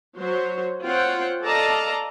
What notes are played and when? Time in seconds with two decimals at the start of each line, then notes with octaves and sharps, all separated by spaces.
0.17 F#3 C5 C#5
0.84 C4 F4 C5 C#5 F#5 G5
1.44 A4 D5 D#5 F5 A5 A#5